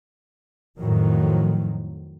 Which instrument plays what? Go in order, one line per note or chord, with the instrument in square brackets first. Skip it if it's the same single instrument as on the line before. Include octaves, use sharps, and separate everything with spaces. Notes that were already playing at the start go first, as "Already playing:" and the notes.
[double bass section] F2 A2 D#3 F3 F#3